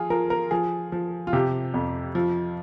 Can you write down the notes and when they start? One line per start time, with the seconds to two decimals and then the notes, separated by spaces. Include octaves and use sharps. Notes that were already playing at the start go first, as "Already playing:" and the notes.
Already playing: F3 F4 G#4
0.10 F3 A#4
0.30 A#4
0.51 F3 G#4
0.92 F3
1.27 F4
1.33 C3 G4
1.74 F2
2.15 F3